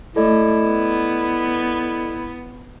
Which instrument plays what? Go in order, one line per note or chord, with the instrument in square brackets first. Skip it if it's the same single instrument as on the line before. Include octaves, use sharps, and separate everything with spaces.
[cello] A3 [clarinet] E4 [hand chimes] A4 D5 D#5
[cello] B3